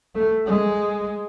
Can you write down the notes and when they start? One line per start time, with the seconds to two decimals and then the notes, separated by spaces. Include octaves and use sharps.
0.15 A3
0.47 G#3